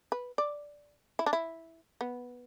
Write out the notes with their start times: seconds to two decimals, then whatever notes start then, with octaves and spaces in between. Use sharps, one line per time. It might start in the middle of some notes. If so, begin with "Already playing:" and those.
0.12 B4
0.38 D5
1.19 E4
1.26 D4
1.33 E4
2.01 B3